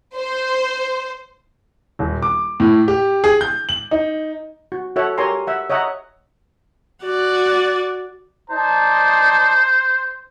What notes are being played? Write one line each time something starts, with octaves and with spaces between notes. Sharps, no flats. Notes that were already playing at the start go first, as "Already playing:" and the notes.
C5
D#1
D6
A2
G4
G#4
G6
F#7
D#4
F#4
F#4 A4 C#5 E5 F#5
G4 A#4 C#5 G#5 A#5 C6
E5 F#5
C#5 D#5 E5 F#5 A#5
F#4 D5
D#4 C5 D5 A5